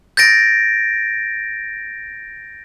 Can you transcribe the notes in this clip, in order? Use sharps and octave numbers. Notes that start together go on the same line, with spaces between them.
G6 A6 A#6 D7